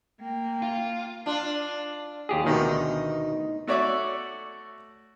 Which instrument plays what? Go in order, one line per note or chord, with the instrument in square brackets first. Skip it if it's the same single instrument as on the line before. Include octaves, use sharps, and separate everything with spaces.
[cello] A#3 [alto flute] G5
[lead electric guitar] F4
[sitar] D4 F4
[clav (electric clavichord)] D#2 G4 G#4
[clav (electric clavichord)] D2 B2 D#3 [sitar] D#4
[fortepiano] A3 F#4 C#5 D5 E5 D6